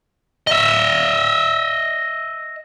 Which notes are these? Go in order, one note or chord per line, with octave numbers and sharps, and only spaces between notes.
D#5 E5